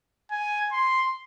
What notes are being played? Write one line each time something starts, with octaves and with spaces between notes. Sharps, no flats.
G#5
C6